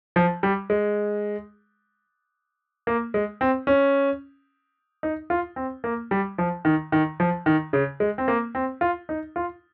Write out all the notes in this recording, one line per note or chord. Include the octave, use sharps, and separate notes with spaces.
F3
G3
G#3
A#3
G#3
C4
C#4
D#4
F4
C4
A#3
G3
F3
D#3
D#3
F3
D#3
C#3
G#3
C4
A#3
C4
F4
D#4
F4